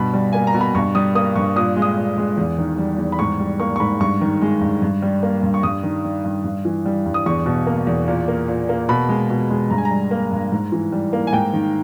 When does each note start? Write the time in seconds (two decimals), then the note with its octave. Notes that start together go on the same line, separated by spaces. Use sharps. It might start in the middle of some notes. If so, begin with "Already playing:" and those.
Already playing: G2 B2 B5
0.14 G3
0.33 A#3 G#5
0.47 A#5
0.54 B2
0.61 B5
0.75 G2 C#6
0.95 G3 D#6
1.15 A#3 D#6
1.35 G2 C#6
1.56 A#2 D#6
1.76 G#3
1.82 D#6
1.97 A#2
2.17 G#3
2.37 E2
2.58 D#3
2.78 G3
2.98 E2
3.12 B5
3.19 G#2 C#6
3.40 G3
3.60 A#3 C#6
3.76 C#6
3.80 G#2 B5
4.00 G2 C#6
4.21 D#3
4.42 G#3
4.61 G2
4.82 G2
5.02 G3
5.23 A#3
5.43 G2
5.54 C#6
5.63 G2 D#6
5.83 D#3
6.04 G3
6.25 G2
6.44 G2
6.65 E3
6.86 G3
7.06 G2
7.14 D#6
7.26 E2 C#6
7.46 B2
7.67 A#3
7.87 E2
8.08 A#2
8.28 A#3
8.48 A#2
8.69 A#3
8.89 B2 B5
9.09 G#3
9.30 B2
9.50 G#3
9.70 G2 A#5
9.78 G#5
9.85 A#5
9.91 G3
10.11 A#3
10.32 G2
10.52 G#2
10.72 E3
10.92 G3
11.13 A#3
11.27 G#5
11.33 G#2 G5
11.53 D#3